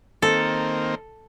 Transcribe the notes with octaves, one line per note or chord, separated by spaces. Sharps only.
D#3 A#3 C4 A4